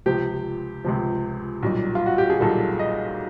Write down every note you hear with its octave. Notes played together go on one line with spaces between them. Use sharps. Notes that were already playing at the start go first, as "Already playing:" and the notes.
C#2 C3 F3 G4
C#2 C3 F3
B1 A#2 G3
F4
F#4
G4
G#4
B1 A#2 G3 A4
D#5